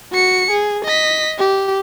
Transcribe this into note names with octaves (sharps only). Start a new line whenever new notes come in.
F#4 C#7
G#4
D#5 B6
G4